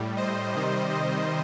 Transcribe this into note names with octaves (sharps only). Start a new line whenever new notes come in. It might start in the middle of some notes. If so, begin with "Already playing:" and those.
Already playing: A2 G3
C5 D#5
C3 D#3 G3
C5 D#5